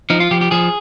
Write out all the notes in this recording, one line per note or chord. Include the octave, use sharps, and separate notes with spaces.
F3 D#4
F4
F3 G4
G4
F3 G#4